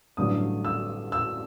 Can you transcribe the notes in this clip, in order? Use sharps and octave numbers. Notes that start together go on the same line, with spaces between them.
A1 G2 D3 F#3 D#6
E6
E6